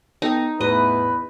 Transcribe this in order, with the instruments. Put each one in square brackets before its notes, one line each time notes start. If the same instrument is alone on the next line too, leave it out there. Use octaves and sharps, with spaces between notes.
[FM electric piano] B3 A4 G5 [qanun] D#4
[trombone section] E2 B4 [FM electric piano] A2 [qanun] D#5